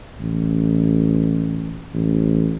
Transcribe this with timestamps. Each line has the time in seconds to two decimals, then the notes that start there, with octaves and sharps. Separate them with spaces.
0.20 A1
1.94 A1